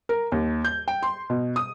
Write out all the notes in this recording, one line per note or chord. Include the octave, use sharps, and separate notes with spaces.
A#4
D#2
G6
G5
C6
B2
D#6